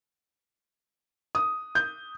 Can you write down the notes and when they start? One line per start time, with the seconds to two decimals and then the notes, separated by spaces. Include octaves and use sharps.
1.35 D#6
1.75 G6